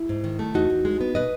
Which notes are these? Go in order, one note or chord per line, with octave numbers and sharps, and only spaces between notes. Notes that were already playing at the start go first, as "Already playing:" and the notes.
Already playing: E4
G#2
D#3
A3
E2 D#4 F#4
E2
G#3
B3
B2 B4 D#5